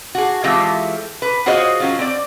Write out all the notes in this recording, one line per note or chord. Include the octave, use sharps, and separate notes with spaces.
F#4 G#4
E3 G#3 A3 C4 F4 G4
B4
F4 F#4 G#4 C5 C#5 D#5
F#3 C#4 F4
C4 D5